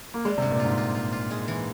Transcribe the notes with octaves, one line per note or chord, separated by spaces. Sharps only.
A#3
G3 G#3
C3
G2
A#2
F4
G#2
F4
F4
F4
G#3
E3